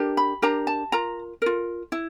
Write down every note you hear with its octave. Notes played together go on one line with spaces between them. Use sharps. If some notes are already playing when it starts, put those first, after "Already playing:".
Already playing: D4 G4 A#4
B5
D4 G4 A#4 A#5
A5
F4 A#4 A#5
F4 A#4
E4